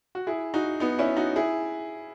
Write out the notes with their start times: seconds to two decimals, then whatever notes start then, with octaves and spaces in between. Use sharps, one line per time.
0.15 F#4
0.27 E4 G#4
0.54 D#4 F#4
0.80 B3 D#4
0.98 C#4 E4
1.17 D#4 F#4
1.36 E4 G#4